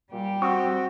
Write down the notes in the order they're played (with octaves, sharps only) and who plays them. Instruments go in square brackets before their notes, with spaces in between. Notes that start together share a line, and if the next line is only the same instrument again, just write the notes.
[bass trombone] A#2 [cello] G3 G4
[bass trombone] C4 [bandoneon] F#4 [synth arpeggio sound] C#6 D#6 E6